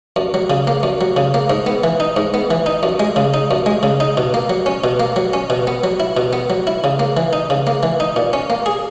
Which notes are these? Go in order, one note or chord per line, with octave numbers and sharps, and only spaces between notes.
F#2
F#3
C#3
A#3
F#2
F#3
C#3
A#3
G#2
B3
E3
D#4
G#2
B3
E3
D#4
F#2
G#3
C#3
D#4
F#2
G#3
C#3
D#4
B2
A#3
F#3
C#4
B2
A#3
F#3
C#4
B2
B3
F#3
E4
B2
B3
F#3
E4
C#3
A#3
E3
D#4
C#3
A#3
E3
D#4
A#2
C#4
A#3
G#4